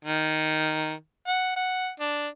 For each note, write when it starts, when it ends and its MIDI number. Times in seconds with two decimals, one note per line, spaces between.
0.05 0.92 51
1.27 1.53 78
1.56 1.89 78
2.00 2.28 62